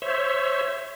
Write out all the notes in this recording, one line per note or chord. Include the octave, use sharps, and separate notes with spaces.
C5 C#5 E5